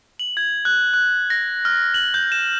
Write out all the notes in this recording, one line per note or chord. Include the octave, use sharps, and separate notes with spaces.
F#7
G#6
F#6
F#6
A#6
F6
F#7
G6
E7